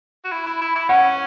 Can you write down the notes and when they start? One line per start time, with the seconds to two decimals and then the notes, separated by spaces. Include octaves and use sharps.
0.24 F#4
0.32 E4
0.47 E4
0.61 E4
0.75 E4
0.89 C#4 F#5